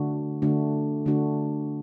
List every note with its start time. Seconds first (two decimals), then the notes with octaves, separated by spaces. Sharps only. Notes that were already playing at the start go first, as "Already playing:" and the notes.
Already playing: D3 A3 D4 F#4
0.42 D3 A3 D4 F#4
1.06 D3 A3 D4 F#4